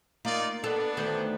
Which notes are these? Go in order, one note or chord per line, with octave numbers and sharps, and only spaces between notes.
A#3 D#4 F4 D5
B3 D4 A4
D2 D#3 C5